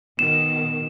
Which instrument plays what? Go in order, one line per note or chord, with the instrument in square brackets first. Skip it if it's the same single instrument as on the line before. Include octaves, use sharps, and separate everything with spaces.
[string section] B2 D#3 [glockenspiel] E7